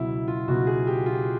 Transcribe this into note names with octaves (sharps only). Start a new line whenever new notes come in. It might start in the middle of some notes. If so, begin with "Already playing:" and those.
Already playing: C#2 B2 F#3 E4
F4
C#2 B2 F#3 F#4
G#4
G4
F4